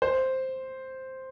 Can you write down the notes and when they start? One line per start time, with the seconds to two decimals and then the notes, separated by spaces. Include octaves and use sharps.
0.02 C5